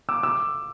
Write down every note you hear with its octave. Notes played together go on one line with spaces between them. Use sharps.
D6 E6
D6 E6